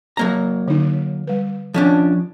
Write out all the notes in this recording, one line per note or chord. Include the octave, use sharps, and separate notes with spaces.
F#3 A#3 A#5
D3 D#4
G3 B4
F3 C#4 D4